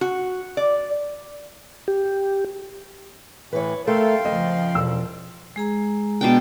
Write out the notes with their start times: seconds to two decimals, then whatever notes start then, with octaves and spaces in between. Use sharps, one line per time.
0.01 F#4
0.57 D5
1.88 G4
3.53 A2 E3 B4 C#5
3.87 A3 A4 A#4 F5 G5 C6
4.25 F2 C#3 F3 D#5
4.74 E1 E6
5.56 G#3 G#4 A#5
6.21 B2 D4 G5